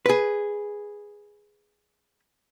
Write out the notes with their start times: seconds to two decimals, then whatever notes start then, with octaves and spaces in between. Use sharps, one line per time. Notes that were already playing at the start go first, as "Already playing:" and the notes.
0.06 G#4 B4